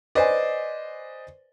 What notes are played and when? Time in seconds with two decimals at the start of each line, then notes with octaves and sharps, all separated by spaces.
0.15 B4 C5 D5 D#5 G#5